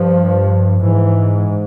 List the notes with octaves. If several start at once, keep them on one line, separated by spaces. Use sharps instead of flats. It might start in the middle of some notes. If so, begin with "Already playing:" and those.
Already playing: G2 F3
G#2 E3